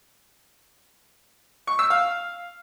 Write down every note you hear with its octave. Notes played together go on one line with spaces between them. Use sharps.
C#6
E6
F5